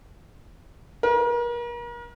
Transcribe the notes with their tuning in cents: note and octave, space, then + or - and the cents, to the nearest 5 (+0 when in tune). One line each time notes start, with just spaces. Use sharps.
A#4 +40